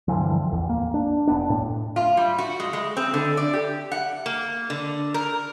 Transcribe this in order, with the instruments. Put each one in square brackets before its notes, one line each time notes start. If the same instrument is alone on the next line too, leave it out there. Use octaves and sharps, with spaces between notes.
[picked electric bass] G2 D3 E3 F3
A1 E2
A#3
D4
E1 B3 D4
A2
[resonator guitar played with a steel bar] F4
G3
F#4
G#3
G#3
C4
D3
D5
G4
F#5
A#3
D3
A#4